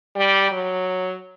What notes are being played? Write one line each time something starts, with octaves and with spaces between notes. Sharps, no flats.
G3
F#3